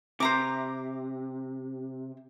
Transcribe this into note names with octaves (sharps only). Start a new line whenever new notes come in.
C3 C5 A#5 D6